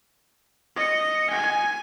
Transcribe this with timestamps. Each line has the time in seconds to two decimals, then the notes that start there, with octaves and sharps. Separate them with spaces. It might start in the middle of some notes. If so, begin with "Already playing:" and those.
0.76 D#5 C#7
1.30 G#5